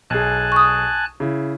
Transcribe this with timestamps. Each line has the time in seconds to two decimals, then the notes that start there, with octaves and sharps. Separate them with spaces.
0.10 B1 G#4 G#5 A5 F#6
0.52 C#6 D#6
1.20 C#3 E4